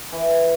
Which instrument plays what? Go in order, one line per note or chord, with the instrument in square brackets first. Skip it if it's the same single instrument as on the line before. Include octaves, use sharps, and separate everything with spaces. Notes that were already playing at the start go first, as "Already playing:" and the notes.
[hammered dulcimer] E3